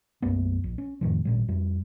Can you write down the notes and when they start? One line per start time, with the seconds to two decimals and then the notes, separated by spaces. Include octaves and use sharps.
0.22 B1 F#2 A#3 B3
0.64 A#1
0.78 C#4
1.01 F2 A2 D#3 F3
1.25 G#1 A#2 G3
1.48 F2 G3